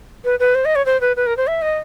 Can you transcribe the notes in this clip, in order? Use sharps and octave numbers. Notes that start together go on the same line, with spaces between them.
B4
B4
C5
D#5
C#5
C5
B4
B4
A#4
C5
E5
D#5